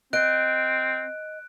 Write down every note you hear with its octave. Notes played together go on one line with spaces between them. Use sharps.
C4 D#5 F#6 D7